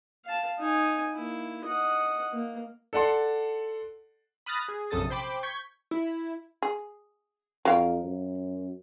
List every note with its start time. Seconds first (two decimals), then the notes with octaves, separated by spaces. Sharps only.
0.25 F5 A5
0.59 D#4 G#5
1.14 A#3 E4
1.64 D#5 F#5
2.33 A#3
2.93 A4 D5 F#5 A5 C6
4.46 B5 D#6 F6 F#6 A6 A#6
4.68 G#4
4.91 A#1 F#2 C3 A4 D#6 A6
5.10 C5 G5 B5 D6
5.43 C#6 G6 G#6 B6
5.91 E4
6.62 G#4
7.65 F2 F#3 F5 G5
8.05 F#2